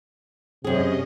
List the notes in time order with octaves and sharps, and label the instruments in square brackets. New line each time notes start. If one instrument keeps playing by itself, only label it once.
[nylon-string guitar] F#2 G#4 [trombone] C3 [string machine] C#4 D#5